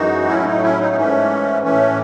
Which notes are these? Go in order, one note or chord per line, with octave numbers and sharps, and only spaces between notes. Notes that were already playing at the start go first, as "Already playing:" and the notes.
Already playing: F#2 E3 G#3 D#4 F#4
A2 F#3 A3 C#4 E4
D#4
C#4 E4
D#4
G#2 E3 A3 C#4
A2 E3 A3 C#4